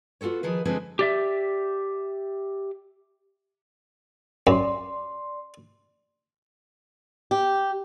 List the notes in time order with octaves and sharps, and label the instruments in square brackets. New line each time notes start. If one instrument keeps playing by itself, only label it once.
[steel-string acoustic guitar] B3 F4 F#4 A4 C#5
D#3 F3 G#4 B4
D3 F3 G#3 C4 G#4 B4
[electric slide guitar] G4 D5 E5
[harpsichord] F#2 [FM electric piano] D5 C6
[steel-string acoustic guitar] G4